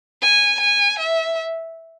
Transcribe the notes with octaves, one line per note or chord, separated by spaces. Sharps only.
G#5
G#5
E5